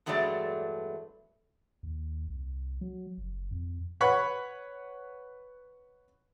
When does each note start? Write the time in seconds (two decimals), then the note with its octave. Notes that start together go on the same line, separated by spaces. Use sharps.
0.06 E2 G2 F#3 G#3 A3 D5
1.83 D#2
2.28 C2
2.81 F#3
3.18 F#1
3.51 F2
4.01 B4 C#5 F#5 B5 C#6